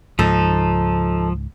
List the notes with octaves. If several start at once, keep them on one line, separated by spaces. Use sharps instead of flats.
C#2 G#2 F3 D#4 A4